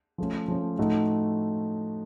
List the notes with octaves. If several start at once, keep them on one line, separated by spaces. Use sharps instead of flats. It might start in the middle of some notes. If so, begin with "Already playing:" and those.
F3 A3 C#4
F3 A3 C#4
A2 F3 A3 D#4 F#4